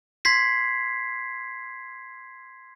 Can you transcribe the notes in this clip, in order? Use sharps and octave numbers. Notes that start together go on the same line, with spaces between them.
C6 G#6 B6 C7